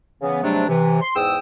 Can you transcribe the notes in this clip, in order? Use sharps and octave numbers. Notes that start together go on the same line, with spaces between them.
C#3 E3 B3
G#2 C3 F#3 G3 A3 D4
C3 E3
C6
E2 G#2 G5 D#6 E6